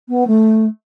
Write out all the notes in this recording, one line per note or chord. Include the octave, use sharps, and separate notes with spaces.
B3
A3